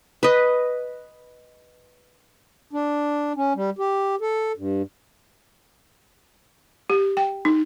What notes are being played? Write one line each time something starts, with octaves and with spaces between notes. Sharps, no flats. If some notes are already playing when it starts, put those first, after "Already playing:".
B4 D#5
D4
C#4
G3
G4
A4
G2
G4
G5
D#4